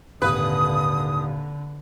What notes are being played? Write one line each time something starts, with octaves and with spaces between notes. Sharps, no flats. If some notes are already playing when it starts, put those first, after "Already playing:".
D#1 G#1 D3 B4 D#6